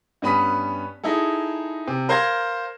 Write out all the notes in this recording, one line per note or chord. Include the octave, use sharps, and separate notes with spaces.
G2 B3 C#4 B5 D#6 B6
D#4 E4 G#4 A4
C3
A#4 C5 F5 A#5 G#6 A#6